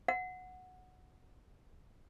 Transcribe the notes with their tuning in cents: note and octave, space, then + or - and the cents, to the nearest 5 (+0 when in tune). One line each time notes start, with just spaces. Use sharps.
F#5 -5